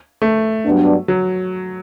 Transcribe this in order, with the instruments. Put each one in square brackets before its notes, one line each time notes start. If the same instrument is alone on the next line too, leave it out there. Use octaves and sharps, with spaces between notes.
[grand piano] A3
[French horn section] G2 F#3 B3 D4
[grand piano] F#3